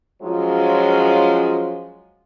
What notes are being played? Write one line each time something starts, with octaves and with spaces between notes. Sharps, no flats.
F3 F#3 G#3 C#4 F4